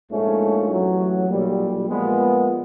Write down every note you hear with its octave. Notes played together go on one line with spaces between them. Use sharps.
A#1 G#2 F3 A3 C#4
A1 A2 F#3
B1 A#2 G3
A#2 F3 G#3 B3